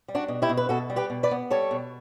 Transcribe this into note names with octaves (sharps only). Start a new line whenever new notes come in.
G3
D4 F#4
B2
E4 G4
B2
B4
B2 F#4 A4
G3
G4 B4
B2
B4 D5
B3
G3 A4 C#5
B2